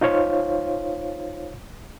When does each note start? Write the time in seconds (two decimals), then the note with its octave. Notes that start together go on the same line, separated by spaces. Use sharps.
0.01 D#4 F4 C5 C#5 F5